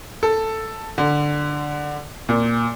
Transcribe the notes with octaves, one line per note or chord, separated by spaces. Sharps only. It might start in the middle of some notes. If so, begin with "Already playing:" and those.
A4
D3
A#2